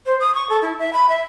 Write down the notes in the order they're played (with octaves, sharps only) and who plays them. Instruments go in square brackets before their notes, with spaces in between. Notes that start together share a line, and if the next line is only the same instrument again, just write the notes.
[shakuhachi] C5
D#6
C#6
A4
E4
E5
B5
E5